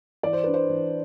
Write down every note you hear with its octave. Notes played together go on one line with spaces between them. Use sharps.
E3 D5
C5
D4 B4
C5
E3